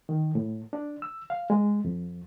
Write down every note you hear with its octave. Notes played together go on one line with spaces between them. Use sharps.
D#3
A2
D4
E6
F5
G#3
F2